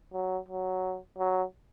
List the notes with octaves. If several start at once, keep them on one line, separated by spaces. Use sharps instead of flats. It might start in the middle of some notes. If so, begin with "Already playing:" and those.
F#3
F#3
F#3